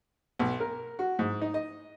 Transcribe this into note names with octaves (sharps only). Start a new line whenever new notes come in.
B1
A#4
F#4
G#2
D#4
D#5